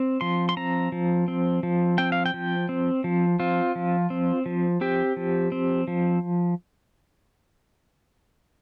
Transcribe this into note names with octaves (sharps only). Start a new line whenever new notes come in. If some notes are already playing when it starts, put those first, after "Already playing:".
Already playing: C4
F3 C6
C6
C4 A#5
F3
C4
F3
C4 G5
F5
G5
F3
C4
F3
C4 F4
F3
C4
F3
C4 G4
F3
C4
F3